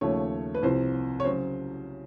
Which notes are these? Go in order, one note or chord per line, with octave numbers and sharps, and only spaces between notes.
D#2 C#3 F3 A3 C#5
B4
C2 C3 F3 C5
C#5
C#3 F#3 C5